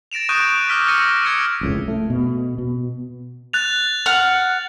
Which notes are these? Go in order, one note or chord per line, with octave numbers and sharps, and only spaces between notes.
A6 A#6 D7 E7 F7
C#6 D#6 F#6 G6 D7 D#7
F7
D6 E6 F6 B6
E6 A#6 C#7 D#7
F6 G#6 A#6 C#7
F1 C#2 A2
A3
B2
B2
F#6 A6 F7
F#5 F6